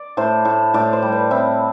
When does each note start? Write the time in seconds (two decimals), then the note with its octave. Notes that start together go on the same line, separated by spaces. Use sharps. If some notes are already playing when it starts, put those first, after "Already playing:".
Already playing: D5
0.17 A2 C5
0.45 A2
0.74 A2 D5
0.93 C5
1.02 G3
1.12 B4
1.31 A2 C4